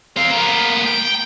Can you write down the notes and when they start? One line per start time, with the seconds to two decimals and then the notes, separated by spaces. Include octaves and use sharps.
0.17 C4 F5
0.30 A#3 B3
0.86 G5